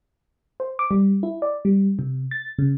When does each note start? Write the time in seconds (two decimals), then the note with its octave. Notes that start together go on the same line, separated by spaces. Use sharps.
0.60 C5
0.79 D6
0.91 G3
1.23 E4
1.42 D5
1.65 G3
1.99 C3
2.31 A6
2.58 C#3